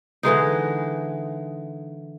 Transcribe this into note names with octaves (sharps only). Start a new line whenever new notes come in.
D3 E3 G#3 D#4